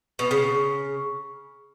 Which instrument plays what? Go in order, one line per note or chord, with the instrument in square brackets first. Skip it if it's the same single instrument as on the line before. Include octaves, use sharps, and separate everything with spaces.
[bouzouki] B2
C#3